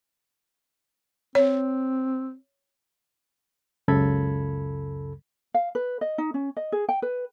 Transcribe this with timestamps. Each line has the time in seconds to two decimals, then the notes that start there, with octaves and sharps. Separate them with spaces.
1.35 C4 C#5
3.88 C#2 F#2 C#3 A4 B5 G#6
5.54 F5
5.75 B4
6.01 D#5
6.18 D#4
6.34 C#4
6.57 D#5
6.72 G#4
6.89 G5
7.02 B4